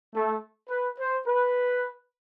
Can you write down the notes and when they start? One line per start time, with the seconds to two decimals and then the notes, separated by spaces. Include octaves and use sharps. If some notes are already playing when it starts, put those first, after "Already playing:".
0.13 A3
0.69 B4
0.98 C5
1.26 B4